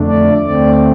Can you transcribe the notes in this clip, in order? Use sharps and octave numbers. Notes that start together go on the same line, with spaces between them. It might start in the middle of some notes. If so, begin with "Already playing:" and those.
Already playing: F2 D3 A3 D4
D5
D2 D3 A3 C4 D5